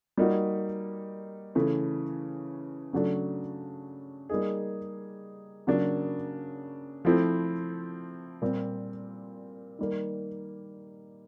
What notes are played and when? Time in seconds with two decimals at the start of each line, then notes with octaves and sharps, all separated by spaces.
0.17 G3 A#3 D#4 F#4
1.55 C#3 E3 A3
2.93 C#3 F#3 A3 D4
4.29 G3 A#3 D#4 G#4
5.67 C#3 F#3 A#3 D4
7.05 F3 A3 C4 E4
8.42 A#2 G3 C4
9.79 D#3 G3 A#3